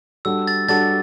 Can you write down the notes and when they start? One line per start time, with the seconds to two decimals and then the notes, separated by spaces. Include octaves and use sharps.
0.25 G3 D4 F#4 A4 E6
0.47 A6
0.69 G3 D4 F#4 A4 A6